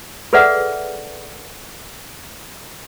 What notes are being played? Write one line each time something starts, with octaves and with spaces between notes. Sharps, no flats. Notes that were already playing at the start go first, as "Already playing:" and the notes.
G#4 A4 B4 D5 E5 F#5